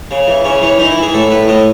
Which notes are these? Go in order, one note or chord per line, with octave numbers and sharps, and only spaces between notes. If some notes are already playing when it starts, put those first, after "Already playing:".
C#3
E3
C#3 C#4
E3 C#4
E3 D#4
E4
E3
G#4
A2 A4
A2 B4
A2 D#5